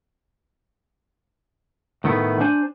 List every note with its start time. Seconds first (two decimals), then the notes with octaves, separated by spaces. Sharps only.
2.04 A2 D#3 A3 B3
2.40 D4 C5 G#5